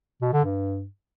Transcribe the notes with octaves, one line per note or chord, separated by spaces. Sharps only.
B2
D3
G2